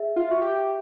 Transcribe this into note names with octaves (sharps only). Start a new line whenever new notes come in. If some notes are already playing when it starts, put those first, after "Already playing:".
Already playing: G#4 E5
F4
F#4 E5
G4